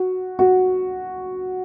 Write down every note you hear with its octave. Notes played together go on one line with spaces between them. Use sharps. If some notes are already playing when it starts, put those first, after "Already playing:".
Already playing: F#4
F#4